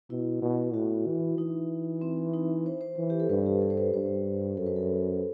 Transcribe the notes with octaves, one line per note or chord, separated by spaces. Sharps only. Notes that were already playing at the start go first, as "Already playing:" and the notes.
B2 E4
B2
A2 F#4
E3
E3 D#4
C4
D#4
C5
C5
E3
G4
A4
G2 B4
G4
A4
C5
B4
G2 C5
F#2 A4
B4
A4